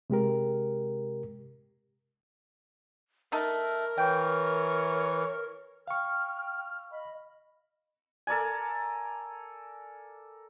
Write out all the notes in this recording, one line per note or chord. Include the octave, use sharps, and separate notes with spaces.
C3 G#3 G4 A#4
A3 D#4 A4 A#4
E3 C#5 G5
F5 G5 C#6 F6
D#5 B5
A4 A#4 D5 G#5